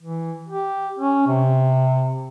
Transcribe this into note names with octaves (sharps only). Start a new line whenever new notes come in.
E3
G4
C#4
C3